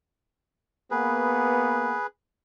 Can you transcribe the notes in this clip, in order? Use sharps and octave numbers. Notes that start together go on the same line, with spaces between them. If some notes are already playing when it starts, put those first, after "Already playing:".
A#3 B3 G#4 B4